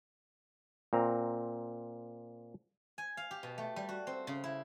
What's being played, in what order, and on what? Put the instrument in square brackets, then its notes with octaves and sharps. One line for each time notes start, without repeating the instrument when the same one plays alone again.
[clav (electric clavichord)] A#2 C4 A#5
[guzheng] G#5
F5
G4
B2
A3
G3
F#4
C4
C#3
E4